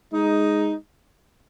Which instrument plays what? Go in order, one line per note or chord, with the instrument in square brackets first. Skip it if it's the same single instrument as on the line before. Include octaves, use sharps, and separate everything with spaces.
[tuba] G#3 [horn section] D#4